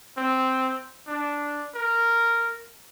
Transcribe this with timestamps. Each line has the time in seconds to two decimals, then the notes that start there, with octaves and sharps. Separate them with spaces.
0.17 C4
1.07 D4
1.74 A#4